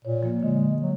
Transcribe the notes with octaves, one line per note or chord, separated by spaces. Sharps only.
A#2 C#5
F3 A#3
D3 G#3
F#3